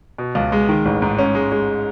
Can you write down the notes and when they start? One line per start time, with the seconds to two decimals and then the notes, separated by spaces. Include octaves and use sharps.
0.18 B2
0.35 C#2
0.52 G#3
0.69 D#3
0.85 A1
1.02 G#2
1.18 C#4
1.35 G#3
1.52 G#3